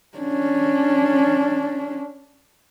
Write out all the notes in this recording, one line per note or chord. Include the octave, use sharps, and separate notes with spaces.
C#4 D4